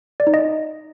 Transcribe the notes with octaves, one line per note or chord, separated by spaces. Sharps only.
D5
D#4
D#5